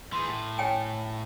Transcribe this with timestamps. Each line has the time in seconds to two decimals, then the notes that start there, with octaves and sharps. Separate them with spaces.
0.13 E3 G#4 C6
0.27 A2
0.58 C#5 G5 G#5